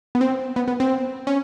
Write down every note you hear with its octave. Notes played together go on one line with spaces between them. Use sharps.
B3
C4
B3
B3
C4
C#4